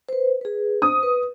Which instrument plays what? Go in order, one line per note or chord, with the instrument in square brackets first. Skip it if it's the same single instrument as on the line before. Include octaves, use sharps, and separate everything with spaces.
[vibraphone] B4 C5
G#4 B4
[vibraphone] C5 [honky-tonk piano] D#6
[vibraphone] B4